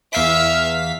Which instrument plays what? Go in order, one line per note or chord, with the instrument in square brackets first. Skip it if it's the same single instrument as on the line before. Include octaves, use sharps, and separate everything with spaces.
[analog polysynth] E2 F5 B6 [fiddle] E5